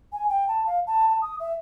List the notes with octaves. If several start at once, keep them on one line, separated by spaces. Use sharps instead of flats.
G#5
G5
A5
F5
A5
A5
D#6
E5